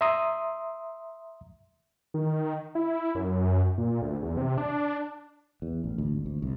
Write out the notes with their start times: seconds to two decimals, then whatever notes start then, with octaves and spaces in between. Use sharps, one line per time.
0.01 E5 A#5 C6 D#6
2.14 D#3
2.75 E4
3.15 F#2
3.78 A#2
4.02 D2
4.22 E2
4.37 C3
4.58 D4
5.62 E2
5.84 A1
5.98 D2
6.13 G#1
6.26 D2
6.42 C2